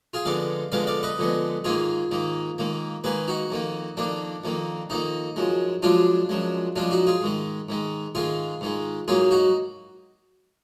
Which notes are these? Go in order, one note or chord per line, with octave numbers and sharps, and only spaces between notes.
F4 G#4
F2 D3 G#3 B3 D5 F5
F2 D3 G#3 B3 D5 F5
D5 F5
B4 D#5
F2 D3 G#3 B3
G#2 D#3 A#3 F4 G#4
G#2 D#3 A#3
G#2 D#3 A#3
G#2 D#3 A#3 G#4 B4
D#4 F#4
F2 D#3 A#3
F2 D#3 A#3 D4
F2 D#3 A#3
F2 D#3 A#3 D#4
F#2 F3 G#3
F#2 F3 G#3 D4 F4
F#2 F3 G#3
F#2 F3 G#3 D4 F4
D#4 F#4
F4 G#4
G#2 D#3 G#3
G#2 D#3 G#3
G#2 D#3 G#3 F4 G#4
G#2 D#3 G#3
G#2 F#3 A#3 F4 G#4
D#4 F#4